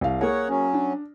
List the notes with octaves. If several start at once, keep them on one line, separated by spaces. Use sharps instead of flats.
C2 F5
A#3 G#4 A#4 C#5 F#5
F#3 C#4
D4